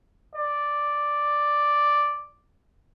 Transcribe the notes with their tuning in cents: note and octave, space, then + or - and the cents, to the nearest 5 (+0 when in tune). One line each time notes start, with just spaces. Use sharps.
D5 +0